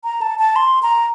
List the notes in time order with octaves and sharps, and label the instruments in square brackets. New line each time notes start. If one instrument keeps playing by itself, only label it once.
[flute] A#5
A5
A5
C6
A#5